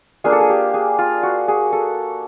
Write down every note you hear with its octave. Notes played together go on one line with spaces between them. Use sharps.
A#3 D4 F4 G#4
A4
G#4
G4
G#4
F4
F#4
G#4
A4